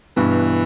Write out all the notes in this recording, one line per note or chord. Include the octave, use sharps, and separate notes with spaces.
G2 B2 E3